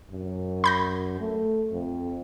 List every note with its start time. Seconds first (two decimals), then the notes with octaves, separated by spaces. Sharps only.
0.11 F#2
0.64 B5 G6 A#6
1.21 A3
1.72 F2